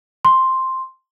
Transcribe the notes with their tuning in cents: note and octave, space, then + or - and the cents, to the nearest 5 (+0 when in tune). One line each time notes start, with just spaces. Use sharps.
C6 +5